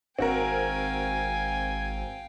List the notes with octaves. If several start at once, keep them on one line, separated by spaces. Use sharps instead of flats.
G#1 C4 F#4 A#4 F5 G5 G#5